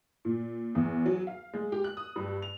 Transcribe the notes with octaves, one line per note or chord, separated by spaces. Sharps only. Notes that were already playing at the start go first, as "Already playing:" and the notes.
A#2
E2
F#3
F5
G#3
G4
F#6
D#6
G2
F7